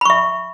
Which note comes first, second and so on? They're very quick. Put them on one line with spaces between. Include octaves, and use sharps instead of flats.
B5 C#6 E5